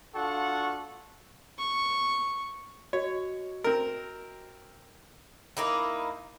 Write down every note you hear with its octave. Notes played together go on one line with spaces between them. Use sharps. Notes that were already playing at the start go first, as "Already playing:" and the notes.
D4 F4 F#4 A4 F#5 C#6
C#6
F#4 C#5 D#5
C4 A#4
A#3 D#4 E4